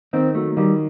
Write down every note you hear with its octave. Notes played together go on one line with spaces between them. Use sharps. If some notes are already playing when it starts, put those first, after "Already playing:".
D#3 C4
F#3 A3
D#3 G3